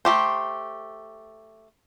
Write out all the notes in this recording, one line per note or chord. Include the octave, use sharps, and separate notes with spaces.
A3 G4 C5